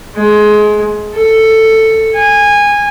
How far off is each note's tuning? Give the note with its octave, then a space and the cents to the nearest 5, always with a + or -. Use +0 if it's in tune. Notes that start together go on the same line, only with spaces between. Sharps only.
G#3 +20
A4 +10
G#5 -15